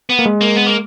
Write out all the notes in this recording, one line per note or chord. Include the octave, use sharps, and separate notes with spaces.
B3
A#3
G#3
A#3
B3
A#3